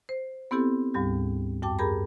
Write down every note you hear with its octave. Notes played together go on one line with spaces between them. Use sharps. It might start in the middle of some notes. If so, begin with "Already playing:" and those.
C5
B3 C4 E4 G4 A4
D2 G#2 G3 G4
F#2 G5 A5 D6
G4 G#4 A#4 A#5 B5